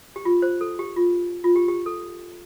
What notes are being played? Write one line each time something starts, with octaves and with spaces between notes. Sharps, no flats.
G4
F4
C5
A4
G4
F4
F4
G4
G4
A4